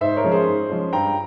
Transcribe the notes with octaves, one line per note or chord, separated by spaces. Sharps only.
G#2 C5 E5
A#4 C#5
F3 G#3 C#4
G#4 C5
G#2
F3 G#3 C#4
G2 G5 A#5